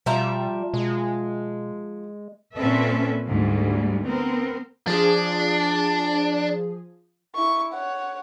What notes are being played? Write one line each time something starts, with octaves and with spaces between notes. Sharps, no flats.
B2 F3 G3 E5 A#5
B2 G#3
A#2 C4 C#4 A4 B4 E5
D2 G#2 G3
B3 C4 A#4
F3 D4 G#4
E4 C#6
C#5 F#5